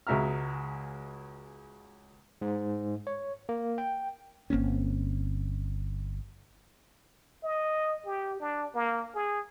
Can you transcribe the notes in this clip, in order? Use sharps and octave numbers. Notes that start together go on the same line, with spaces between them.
C#2 G#3 F#4 E5 A#5 F6
G#2
C#5
A#3
G5
G1 A#3 C4 C#4
D#5
G4
D4
A#3
G#4